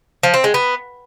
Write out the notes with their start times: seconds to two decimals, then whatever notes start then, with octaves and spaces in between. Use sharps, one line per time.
0.23 F3
0.34 C4
0.44 G#3
0.54 B3